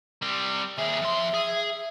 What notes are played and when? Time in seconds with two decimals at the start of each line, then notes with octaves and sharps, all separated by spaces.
0.22 G3 C4
0.78 D#2 G#4 E5
1.01 F2 C6
1.34 G#4